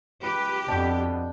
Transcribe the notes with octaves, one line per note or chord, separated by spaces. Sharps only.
C#2 G4 B4
F2 B2 D4 G5